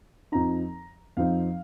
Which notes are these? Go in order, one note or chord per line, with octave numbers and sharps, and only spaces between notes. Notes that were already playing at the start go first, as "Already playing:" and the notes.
F2 F3 C4 D#4 A#5
F2 F3 C4 D#4 F5